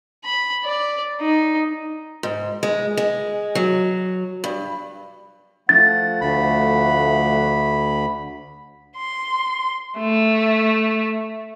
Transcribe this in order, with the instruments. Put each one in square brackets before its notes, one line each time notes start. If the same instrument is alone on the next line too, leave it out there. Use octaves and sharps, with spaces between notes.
[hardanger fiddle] B5
D5
D#4
[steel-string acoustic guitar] G#2
G#3
G#3
F#3
G2
[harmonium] F3 A3 F#5 [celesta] A6
[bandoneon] D2 B5
[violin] C6
A3